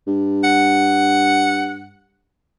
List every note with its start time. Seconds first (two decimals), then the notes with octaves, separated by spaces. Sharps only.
0.07 G2
0.44 F#5